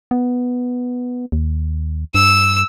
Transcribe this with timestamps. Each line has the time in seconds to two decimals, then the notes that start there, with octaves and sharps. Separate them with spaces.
0.11 B3
1.32 D#2
2.15 G2 E6